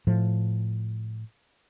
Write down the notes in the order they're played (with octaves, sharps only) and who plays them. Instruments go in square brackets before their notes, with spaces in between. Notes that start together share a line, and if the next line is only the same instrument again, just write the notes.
[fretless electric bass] A2 F3